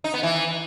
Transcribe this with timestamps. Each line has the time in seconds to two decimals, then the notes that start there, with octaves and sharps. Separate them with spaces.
0.04 D#4
0.14 B3
0.23 E3